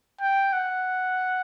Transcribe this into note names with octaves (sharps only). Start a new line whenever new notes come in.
G5
F#5